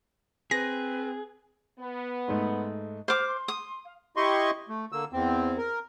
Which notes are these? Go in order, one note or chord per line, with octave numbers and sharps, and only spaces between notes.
C4 G#4 B4 A#6
B3
G#2 G#3 A3
C5 D6 F6
C6
D#6
F5
E4 G4 D#5 C6 C#6
A3
D3 A#3 E6
E2 C4
A#4